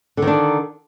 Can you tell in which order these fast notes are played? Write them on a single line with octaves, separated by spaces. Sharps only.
D3 D#3 D4